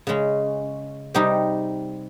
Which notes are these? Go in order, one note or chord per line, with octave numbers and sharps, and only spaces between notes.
C#3 G#3 C#4
C3 G3 C4 D#4 G4